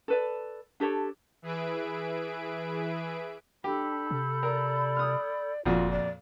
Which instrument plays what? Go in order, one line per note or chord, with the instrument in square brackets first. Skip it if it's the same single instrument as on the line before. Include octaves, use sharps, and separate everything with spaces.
[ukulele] A4 B4 D5
D4 G4 A4 C#5
[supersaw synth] E3 G#4 B4 E5 D7
[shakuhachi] D4 [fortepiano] G4 [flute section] A4 B5 G6
[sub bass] C3
[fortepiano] A#4 [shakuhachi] D5
[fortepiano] D#6 F6
[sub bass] F#1 [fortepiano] F2 A#2 F#4 [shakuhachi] F4
[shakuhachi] D5